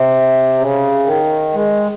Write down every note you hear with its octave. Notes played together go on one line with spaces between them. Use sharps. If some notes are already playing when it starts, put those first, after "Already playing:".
Already playing: C3
C#3
D#3
G#3